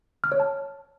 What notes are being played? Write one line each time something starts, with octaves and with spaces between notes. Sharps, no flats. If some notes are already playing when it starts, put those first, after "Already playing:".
F6
C#5
A5